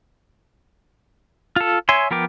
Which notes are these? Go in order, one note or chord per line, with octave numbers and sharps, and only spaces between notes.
F4 A4
C#5 E5 G#5 C6
F3 B3 A#4 G5 D6